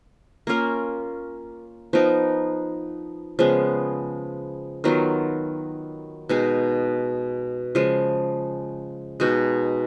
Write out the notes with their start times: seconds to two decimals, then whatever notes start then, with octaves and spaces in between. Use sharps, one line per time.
0.47 A#3 C#4 F4 A#4
1.93 F3 B3 D#4 A#4
3.39 C#3 F3 G#3 B3
4.84 D#3 F#3 B3 F4
6.29 B2 G#3 D#4 G#4
7.75 C#3 F3 G#3
9.20 B2 G#3 D#4 F#4